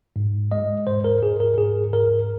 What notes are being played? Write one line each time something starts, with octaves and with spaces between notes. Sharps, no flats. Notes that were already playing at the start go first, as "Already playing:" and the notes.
G#2
G#3 D#5
G#2 C5
A#4
G#2 G#4
A#4
G#2 G#4
G#2 A#4